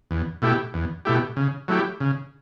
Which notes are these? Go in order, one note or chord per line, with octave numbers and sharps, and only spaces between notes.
E2
B2 A3 E4 G4
E2
B2 A3 E4 G4
C#3
F#3 A3 E4 G4
C#3